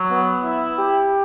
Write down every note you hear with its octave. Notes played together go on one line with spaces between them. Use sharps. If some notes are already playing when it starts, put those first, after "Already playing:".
Already playing: F#3
B3
E4
G4